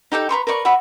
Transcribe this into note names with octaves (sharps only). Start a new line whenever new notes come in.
D#4 G4 A4 G5
B4 A#5 C6 C#6
A#4 B4 D5 C#6
F#4 D5 E5 B5